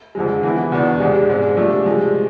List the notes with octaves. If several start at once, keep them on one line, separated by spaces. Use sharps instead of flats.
F2 D3 F3 G#3
E3 B3 E4
E2 B2 B3 D4
F2 C3 G#3 D4
G#2 G#3 D4
C3 F3 A3 D4
C3 F3 G#3